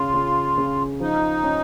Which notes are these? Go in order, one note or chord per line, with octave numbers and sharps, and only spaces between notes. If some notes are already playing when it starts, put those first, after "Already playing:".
Already playing: C#3 C#4 F4
C#3
C#3
F3 D#4
C#4